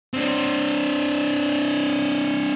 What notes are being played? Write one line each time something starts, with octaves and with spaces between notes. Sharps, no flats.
C4 D4